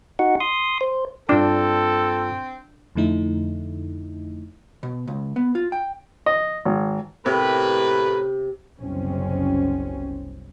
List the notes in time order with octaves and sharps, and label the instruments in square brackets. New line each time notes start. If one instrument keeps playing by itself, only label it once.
[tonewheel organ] D#4 F#4 F#5
C6 D#6
C5
[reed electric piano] G2 F4 D6 [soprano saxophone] C4 [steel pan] D4 [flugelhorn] A4
[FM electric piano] F2 D3 A3 D#4 E4
[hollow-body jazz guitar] B2
C#2
B3
F4
G5
[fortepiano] D#5
G#1
[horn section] A2 A#4 B4 [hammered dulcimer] C3
[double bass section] F#1 C2 B2 C4 C#4